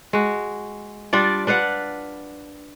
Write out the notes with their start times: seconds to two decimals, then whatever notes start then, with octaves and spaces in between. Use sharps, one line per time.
0.13 G#3 F#4
1.13 G3 D4 F4 D5
1.47 D4 B4 F5 F#5